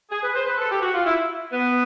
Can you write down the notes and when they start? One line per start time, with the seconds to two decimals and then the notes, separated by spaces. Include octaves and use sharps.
0.11 G#4
0.23 B4
0.34 C5
0.46 B4
0.58 A4
0.70 G4
0.81 F#4
0.93 F4
1.05 E4
1.52 B3